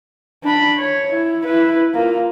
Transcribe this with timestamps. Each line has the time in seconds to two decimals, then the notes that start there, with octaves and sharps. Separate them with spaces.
0.44 D4 B5
0.78 C#5
1.11 E4
1.44 E4 B4
1.94 A#3 F4